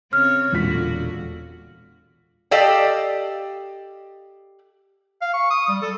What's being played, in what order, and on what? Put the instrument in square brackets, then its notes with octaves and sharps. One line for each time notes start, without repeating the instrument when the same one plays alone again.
[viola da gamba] C#3 C4 C#5 [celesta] F6
[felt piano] E1 F4 B6 [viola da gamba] A#2 D3 F#4
[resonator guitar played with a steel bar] G4 A4 D5 D#5 F5 G5
[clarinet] F5
C#6
D#6
G3
A4